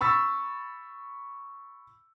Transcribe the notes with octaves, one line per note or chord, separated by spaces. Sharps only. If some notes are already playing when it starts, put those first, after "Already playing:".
B5 C#6 E6 A6 B6